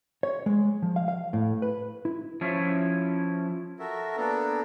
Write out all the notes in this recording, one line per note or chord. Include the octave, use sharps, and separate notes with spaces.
C#5
G#3
F3
F5
F5
A2
B4
E4
F3 C#4 E4
F#4 A4 A#4 E5
A#3 B3 D4 A4